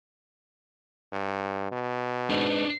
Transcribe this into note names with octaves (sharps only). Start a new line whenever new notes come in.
G2
B2
G#2 E3 D4 D#4